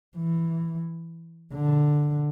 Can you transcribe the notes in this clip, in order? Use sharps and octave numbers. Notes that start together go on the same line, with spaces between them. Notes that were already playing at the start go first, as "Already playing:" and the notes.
E3
D3